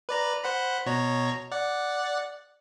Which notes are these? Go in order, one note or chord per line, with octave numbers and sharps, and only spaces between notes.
B4 D5 A#5
C5 F#5 B5
B2 C#5 A#5
D5 F#5